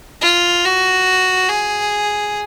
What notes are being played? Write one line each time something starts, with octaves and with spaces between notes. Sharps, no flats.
F4
F#4
G#4